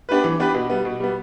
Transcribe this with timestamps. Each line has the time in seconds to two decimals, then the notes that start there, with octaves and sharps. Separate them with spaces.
0.09 B3 D4 G4 B4
0.24 E3
0.40 B3 D4 G4 B4
0.54 B2
0.70 G3 B3
0.85 B2
1.00 G3 B3